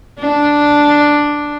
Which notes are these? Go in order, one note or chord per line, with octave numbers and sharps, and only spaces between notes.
D4